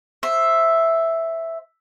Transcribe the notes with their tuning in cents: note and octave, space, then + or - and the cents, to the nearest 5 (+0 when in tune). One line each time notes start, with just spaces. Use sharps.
C5 +15 E5 +0